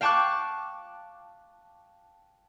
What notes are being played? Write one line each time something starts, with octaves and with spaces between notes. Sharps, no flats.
F5 G5 A5 C#6 D6 F#6